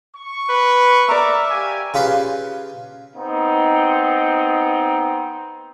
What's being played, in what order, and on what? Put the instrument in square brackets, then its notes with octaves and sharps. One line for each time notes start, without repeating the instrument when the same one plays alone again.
[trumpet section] C#6
[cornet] B4
[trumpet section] A#4 D6 [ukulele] D5 A#5 [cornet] E5
[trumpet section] G4 F5 G#5
[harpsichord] C#3 F4 G4 B4 C5
[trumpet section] B3 C4 D#4